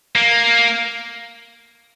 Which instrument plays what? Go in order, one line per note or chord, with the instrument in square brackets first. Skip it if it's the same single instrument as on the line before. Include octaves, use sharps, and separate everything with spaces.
[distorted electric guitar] A#3